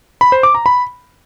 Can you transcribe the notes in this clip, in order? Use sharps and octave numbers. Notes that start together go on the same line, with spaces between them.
B5
C5
D6
A#5
B5